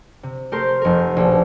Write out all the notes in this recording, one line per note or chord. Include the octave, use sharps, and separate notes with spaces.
C3
A3 G4 A#4 C5
F1 A#4
A#1 B2